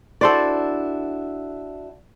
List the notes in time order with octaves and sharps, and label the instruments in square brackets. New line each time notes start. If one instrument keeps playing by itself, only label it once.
[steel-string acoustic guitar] D4 E4 F#4 [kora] A4 C5 D5